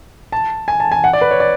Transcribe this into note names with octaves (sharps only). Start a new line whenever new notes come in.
A5
G#5
A5
G#5
F#5
D5
B4
C#5
D5